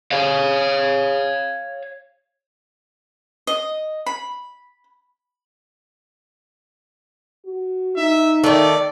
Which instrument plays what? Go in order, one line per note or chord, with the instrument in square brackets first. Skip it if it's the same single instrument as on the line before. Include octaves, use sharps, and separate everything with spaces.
[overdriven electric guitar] C#5 F5
[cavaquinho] D#5
B5
[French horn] F#4
[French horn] D#4 [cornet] E5
[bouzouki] D#3 A3 [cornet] D5